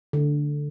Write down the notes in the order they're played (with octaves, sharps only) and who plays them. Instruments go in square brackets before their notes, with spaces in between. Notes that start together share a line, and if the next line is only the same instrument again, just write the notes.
[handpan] D3